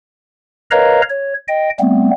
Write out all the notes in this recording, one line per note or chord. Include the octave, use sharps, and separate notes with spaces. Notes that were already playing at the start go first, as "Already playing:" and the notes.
A#4 B4 C#5 D#5 F5 A#5
C#5
D#5 G5
G3 A3 B3 C4